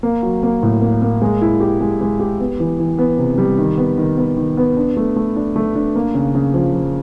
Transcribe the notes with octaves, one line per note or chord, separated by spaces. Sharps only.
A#3
F#3
A#3
A2
A#3
A#3
G#3
E4
G4
G#3
G#3
G4
B3
E3
E3
B3
C3
G3
D#3
B3
D#3
B3
D#3
B3
D4
A3
A3
D4
A3
D4
A#3
C#3
C#3
F3
F3